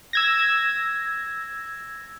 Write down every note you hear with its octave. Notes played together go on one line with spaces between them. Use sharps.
E6 G#6 A#6